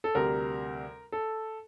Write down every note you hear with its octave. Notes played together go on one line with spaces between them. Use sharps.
A4
D2 C3 G3 A#4
A4